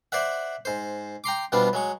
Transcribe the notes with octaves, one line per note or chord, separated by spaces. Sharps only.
C5 D5 E5 F#5
G#2 C5
G5 A#5 C6 D6
B2 F3 G3 B3 D4 F4
F#3 G#3 C#6